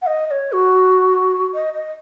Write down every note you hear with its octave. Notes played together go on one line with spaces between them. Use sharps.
F#5
D#5
D#5
C#5
F#4
D#5
D#5